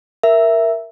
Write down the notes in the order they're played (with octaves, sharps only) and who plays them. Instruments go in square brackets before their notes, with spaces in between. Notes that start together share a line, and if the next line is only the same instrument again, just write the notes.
[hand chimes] A#4 E5